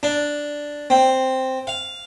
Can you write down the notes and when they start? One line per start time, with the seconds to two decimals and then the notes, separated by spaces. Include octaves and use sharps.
0.03 D4
0.90 C4
1.67 F5